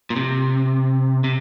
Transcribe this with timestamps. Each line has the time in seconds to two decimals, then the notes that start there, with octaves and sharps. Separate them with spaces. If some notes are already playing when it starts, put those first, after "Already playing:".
0.10 A#2
0.16 C3
1.24 C3